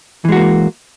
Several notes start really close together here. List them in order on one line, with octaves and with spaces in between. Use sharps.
E3 G#3 F#4 A#3